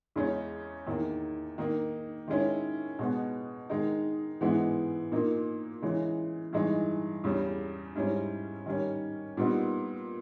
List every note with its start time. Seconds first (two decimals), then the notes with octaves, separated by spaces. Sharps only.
0.16 E2 C#3 G#3 C#4
0.86 E2 D#3 A#3
1.58 D#3 A#3 D#4
2.28 D#3 G#3 C#4 E4
2.99 B2 G#3 B3
3.70 D#3 G#3 D#4
4.41 G#2 E3 G#3 B3 E4
5.12 A#2 A#3 D#4
5.82 C#3 E3 G#3
6.53 G2 E3 G#3 D#4
7.24 E2 C#3 G3
7.95 G#2 G3 C#4 E4
8.66 D#3 G3 C#4
9.37 A#2 G3 B3 D#4